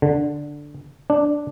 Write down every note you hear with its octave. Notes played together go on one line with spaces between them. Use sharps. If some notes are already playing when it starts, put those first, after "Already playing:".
D3
D4